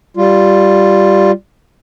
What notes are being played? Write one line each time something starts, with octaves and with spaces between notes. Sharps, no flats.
G3 F4